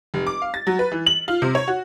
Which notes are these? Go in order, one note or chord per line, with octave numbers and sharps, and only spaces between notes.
F1
D6
F5
A6
F#3
B4
E3
F#7
F4
C3
C#5
F#4